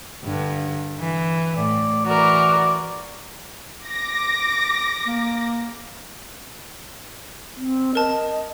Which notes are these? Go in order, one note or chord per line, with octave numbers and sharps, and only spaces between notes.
G2 D3
E3
A2 D5
E3 F#4 A#4 D5
D6 A#6
A#3
C4
A#4 D#5 A5